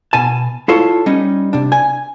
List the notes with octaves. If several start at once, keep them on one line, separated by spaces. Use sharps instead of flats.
B2 G#5 A5
E4 F4 A4 C#5
G3 C#4 D#4
C3 D4
G#5